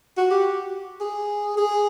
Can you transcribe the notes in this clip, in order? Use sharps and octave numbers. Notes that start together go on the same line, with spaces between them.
F#4
G4
G#4
G#4